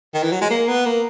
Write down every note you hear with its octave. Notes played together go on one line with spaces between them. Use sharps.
D#3
E3
F#3
G#3
A#3
B3
A#3